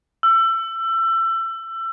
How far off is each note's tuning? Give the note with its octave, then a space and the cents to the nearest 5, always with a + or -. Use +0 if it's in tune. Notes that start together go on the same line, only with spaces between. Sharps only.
E6 +25